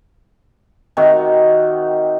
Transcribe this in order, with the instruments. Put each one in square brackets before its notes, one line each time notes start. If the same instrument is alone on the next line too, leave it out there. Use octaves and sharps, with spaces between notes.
[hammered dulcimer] C3 D#3 D#4 F#4